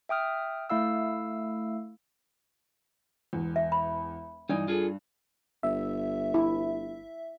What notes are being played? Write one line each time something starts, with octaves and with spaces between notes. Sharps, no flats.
E5 G5 D#6 F6
A3 E4 F5 E6
E1 E2
E5
B5
G2 E3 D4 D#4 D5
F4 G#4 A4
G1 E5
E4